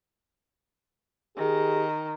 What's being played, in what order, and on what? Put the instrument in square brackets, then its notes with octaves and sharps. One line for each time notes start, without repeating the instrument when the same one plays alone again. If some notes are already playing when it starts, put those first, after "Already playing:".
[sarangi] D#3 [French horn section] G4 G#4